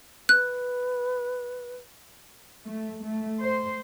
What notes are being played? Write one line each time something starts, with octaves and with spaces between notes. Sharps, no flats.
B4 F#6
A3
A3
C5